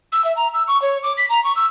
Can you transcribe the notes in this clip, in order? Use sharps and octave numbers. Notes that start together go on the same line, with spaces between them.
E6
E5
A#5
E6
C#6
C#5
D6
B6
A#5
C#6
E6